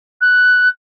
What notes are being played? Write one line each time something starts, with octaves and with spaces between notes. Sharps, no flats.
F#6